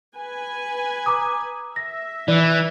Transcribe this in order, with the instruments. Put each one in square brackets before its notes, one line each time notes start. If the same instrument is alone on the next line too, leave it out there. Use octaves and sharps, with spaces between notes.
[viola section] B4 G#5
[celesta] A#5 D6 D#6
[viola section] E5 [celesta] A#6
[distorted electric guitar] E3 [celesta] D5